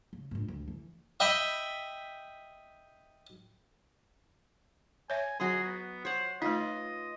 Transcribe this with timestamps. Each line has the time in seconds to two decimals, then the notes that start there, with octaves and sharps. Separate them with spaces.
0.13 C#3
0.31 A#1 G#2
0.48 D2
0.68 E3
1.20 D#5 E5 G5 B5
5.10 C#5 E5 G#5
5.40 F#3 F#4 G#4 D#5 A#5
5.64 B3
6.05 C5 C#5 F#5
6.42 A3 D#4 F4 B4 D#5